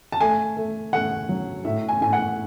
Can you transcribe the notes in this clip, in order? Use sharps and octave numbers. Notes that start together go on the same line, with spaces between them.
A5
A3 G#5
A3
A3 F#5
F#3
A2 E5
G#5
A2 G#5
F#5